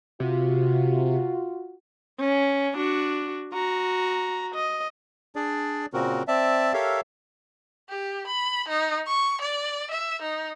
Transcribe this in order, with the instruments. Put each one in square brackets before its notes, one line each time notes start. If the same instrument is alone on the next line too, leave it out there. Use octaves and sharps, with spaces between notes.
[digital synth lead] C3 [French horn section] F4 F#4
[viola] C#4
D4 F#4
F#4 A#5
D#5
[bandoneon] D4 G#4 D5
A#2 C#3 C4 F#4 A#4
C4 D5 E5 A5
G4 A4 A#4 C#5 E5 F5
[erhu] G4
B5
D#4
C#6
D5
E5
D#4